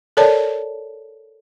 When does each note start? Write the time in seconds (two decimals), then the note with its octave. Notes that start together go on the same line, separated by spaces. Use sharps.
0.17 A4 A#4 C#5 D5 A5